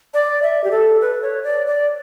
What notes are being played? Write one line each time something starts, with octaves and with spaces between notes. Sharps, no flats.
D5
E5
G4
A4
B4
C#5
D5
D5